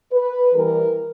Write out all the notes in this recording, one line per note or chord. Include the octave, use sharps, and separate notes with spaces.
B4
E3 G3 B3 A#4